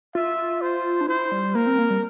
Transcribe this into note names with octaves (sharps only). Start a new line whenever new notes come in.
F4 E5
C5
D4
E4 C5
G3
A#3 A#4
C4
A#3
G3